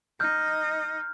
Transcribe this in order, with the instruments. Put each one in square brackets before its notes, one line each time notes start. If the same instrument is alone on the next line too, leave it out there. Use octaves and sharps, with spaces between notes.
[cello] D#4 D#5 [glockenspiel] F6 G6